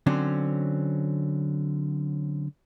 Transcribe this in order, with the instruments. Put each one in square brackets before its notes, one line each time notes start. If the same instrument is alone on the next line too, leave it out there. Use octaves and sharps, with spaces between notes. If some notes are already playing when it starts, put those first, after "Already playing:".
[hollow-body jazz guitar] D3 F#3 C4 C#4